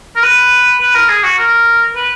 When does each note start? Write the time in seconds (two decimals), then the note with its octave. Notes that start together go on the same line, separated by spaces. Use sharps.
0.16 A#4
0.23 B4
0.80 B4
0.95 A#4
1.09 G#4
1.23 F#4
1.38 A#4
1.96 B4